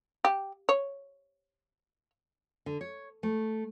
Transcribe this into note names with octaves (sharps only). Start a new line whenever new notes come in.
G4
C#5
D3
C#5
A3